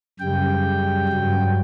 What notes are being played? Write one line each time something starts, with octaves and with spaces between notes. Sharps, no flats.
F#2 C#3 G3 G5
G2 F#3